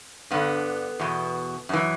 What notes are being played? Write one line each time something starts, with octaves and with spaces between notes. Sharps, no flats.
G2 D3 B3
E2 B2
F#2 E3